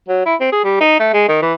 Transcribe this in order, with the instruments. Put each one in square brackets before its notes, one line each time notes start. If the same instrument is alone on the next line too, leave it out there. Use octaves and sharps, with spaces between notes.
[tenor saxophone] F#3
E4
C4
G#4
G3
D#4
A3
G#3
D#3
E3